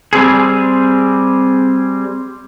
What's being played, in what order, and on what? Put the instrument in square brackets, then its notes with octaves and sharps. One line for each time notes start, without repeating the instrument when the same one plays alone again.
[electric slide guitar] G3 C4 G#4